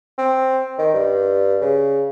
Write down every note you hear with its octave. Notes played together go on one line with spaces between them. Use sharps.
C4
D#3
G2
C#3